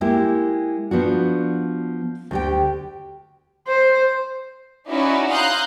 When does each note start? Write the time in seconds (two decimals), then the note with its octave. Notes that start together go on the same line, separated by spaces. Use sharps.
0.01 G#3 A#3 E4 G4
0.91 F3 B3 D4 F#4
2.31 D2 G4 G5
3.67 C5
4.89 C#4 D#4 E4 F#4 D5
5.31 F5 A#5 C6 D#6 F#6 G6